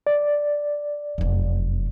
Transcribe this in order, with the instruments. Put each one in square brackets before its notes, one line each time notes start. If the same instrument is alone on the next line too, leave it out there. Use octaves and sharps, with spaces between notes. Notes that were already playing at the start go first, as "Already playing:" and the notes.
[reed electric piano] D5
[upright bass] F1 F#2